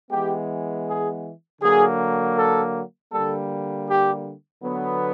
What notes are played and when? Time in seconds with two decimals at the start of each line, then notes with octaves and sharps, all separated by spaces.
0.10 E3 G#3 B3 G4
0.86 G#4
1.62 D3 F#3 A#3 G#4
2.37 A4
3.13 D3 G3 A#3 A4
3.88 G4
4.64 D3 F#3 B3